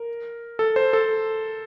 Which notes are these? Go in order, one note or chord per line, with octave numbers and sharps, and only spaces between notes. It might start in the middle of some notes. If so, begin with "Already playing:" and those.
Already playing: A#4
A4
C5
A4